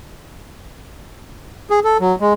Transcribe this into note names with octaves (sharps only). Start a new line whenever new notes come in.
G#4
A4
F#3
G#3